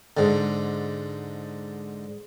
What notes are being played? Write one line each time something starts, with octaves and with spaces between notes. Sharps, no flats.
G#2 D3